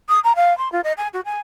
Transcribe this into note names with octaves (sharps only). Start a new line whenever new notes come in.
D#6
A#5
F5
C6
F4
D#5
G#5
F#4
G#5